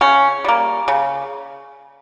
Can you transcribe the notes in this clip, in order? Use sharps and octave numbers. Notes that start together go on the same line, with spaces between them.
C#3 C#4
G3 A#3
C#3